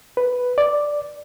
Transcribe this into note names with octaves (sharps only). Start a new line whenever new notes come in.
B4
D5